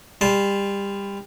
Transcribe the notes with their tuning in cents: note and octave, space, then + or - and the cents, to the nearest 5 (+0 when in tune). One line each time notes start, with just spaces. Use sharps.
G3 +25 A5 -15 C6 +0